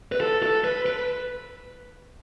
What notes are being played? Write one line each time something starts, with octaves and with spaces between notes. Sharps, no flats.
B4
A4
A4
B4
B4